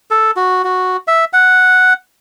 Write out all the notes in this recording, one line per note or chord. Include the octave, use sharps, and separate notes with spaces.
A4
F#4
F#4
E5
F#5